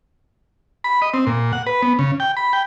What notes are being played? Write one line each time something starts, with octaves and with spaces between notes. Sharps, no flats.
B5
D#5
C4
A#2
F#5
B4
B3
C#3
G5
B5
G5